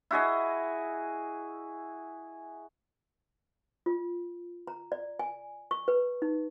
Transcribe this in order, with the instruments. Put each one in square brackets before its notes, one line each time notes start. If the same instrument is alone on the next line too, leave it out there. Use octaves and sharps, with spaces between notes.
[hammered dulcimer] E4 F#4 G#4 D#5
[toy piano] F4
A#5
D5
G#5
C#6
B4
D#4